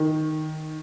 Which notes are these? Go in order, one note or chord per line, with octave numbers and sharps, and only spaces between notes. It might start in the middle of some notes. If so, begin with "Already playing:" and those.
Already playing: D#3